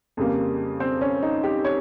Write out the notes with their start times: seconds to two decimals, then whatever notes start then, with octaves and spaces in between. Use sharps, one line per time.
0.17 F2 C#3 G3 A#3
0.80 C4
1.01 C#4
1.23 D#4
1.44 G4
1.65 C#5